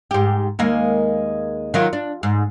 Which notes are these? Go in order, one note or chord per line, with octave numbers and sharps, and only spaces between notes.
G#2 G4
D#2 G#3 A#3
D#3 F#3 F4
D4
G#2